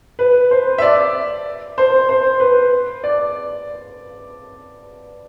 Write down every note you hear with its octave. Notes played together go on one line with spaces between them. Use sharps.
B4
C5
E5
D5
C5
C5
B4
D5